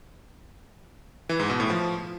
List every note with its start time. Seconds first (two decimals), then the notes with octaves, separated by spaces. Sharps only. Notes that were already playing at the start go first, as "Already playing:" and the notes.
1.29 E3
1.40 G#2
1.50 B2
1.60 A2
1.70 F3